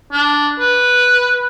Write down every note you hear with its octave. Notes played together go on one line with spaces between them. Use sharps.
D4
B4